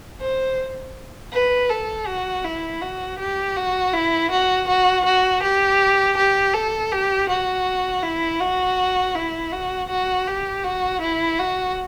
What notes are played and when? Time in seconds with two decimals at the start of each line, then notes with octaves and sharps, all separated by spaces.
0.20 C5
1.32 B4
1.69 A4
2.07 F#4
2.44 E4
2.82 F#4
3.19 G4
3.56 F#4
3.93 E4
4.31 F#4
4.68 F#4
5.05 F#4
5.42 G4
6.17 G4
6.54 A4
6.92 G4
7.29 F#4
8.03 E4
8.40 F#4
9.15 E4
9.52 F#4
9.89 F#4
10.27 G4
10.64 F#4
11.01 E4
11.39 F#4